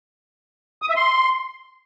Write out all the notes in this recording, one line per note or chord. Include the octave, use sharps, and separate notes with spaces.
D#6
E5
C6